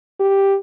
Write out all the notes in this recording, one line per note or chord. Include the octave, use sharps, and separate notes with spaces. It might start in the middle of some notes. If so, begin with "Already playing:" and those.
G4